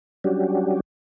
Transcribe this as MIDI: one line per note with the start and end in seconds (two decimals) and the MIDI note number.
0.24 0.80 54
0.24 0.80 55
0.24 0.80 61
0.24 0.80 62
0.24 0.80 66
0.24 0.80 67